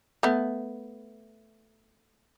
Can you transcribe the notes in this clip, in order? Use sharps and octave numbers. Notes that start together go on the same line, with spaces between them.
A3 B3